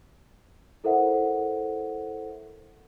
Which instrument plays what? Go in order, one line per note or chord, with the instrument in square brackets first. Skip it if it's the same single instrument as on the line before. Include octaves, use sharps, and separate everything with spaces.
[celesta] E4 A4 A#4 C5 E5 F#5